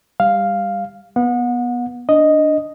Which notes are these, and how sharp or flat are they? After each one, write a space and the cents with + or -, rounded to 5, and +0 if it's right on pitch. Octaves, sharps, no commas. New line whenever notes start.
G3 +25 F5 +0
B3 -15 F#5 -35
D4 +0 D#5 +0